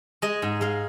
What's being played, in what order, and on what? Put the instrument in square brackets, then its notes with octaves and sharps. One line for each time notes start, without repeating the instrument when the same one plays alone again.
[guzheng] G#3 D#5
G#2
G#3 F5